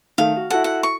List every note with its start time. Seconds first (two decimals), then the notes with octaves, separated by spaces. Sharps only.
0.18 D#3 A3 F5
0.36 F#4
0.50 E4 F#4 A4 F#5
0.64 F#5
0.83 C#6